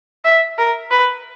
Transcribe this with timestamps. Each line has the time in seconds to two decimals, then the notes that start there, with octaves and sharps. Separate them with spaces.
0.25 E5
0.58 A#4
0.91 B4